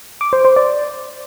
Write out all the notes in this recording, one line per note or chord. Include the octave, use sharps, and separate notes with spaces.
D6
C5
C5
D5